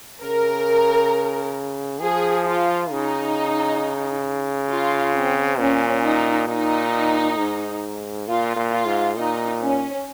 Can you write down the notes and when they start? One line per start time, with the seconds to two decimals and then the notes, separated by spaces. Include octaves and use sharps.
0.22 C#3 A#4
2.02 F3 G#4
2.46 F4
2.91 C#3 D#4
4.70 F4
5.14 C4
5.59 A#2 C#4
6.04 D#4
6.48 A#2 D#4
7.37 G#2
8.28 A#2 F4
8.56 A#2
8.71 F4
8.87 G#2
9.17 A#2 D#4
9.62 C#4